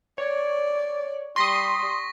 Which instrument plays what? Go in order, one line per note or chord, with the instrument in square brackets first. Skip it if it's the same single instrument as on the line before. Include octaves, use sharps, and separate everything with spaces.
[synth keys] C#5 [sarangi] D5
[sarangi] G3 [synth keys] C6 D#6 [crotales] C#6 A#6 B6